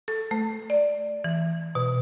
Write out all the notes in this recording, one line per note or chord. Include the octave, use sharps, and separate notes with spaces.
A4
A3
D5
E3
B2